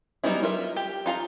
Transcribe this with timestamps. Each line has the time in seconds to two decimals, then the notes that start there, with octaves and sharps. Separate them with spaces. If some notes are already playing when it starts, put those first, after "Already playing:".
0.24 F#3 G3 B3 D#4 E4
0.43 F4 A#4 E5
0.76 G4
1.06 D#4 F4 A5 A#5